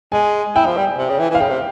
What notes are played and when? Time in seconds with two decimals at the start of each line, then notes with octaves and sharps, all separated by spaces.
0.12 G#3 G#5
0.56 E4 G5
0.66 F3
0.77 G3
0.98 C3
1.09 C#3
1.19 E3
1.30 E3
1.35 F5
1.40 C#3 G5
1.49 C3